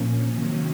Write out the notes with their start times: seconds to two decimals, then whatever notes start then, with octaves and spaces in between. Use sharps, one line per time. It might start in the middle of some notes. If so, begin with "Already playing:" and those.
Already playing: A#2 F3 A#3 C#4
0.30 C3 D#3 F#3 A#3 C#4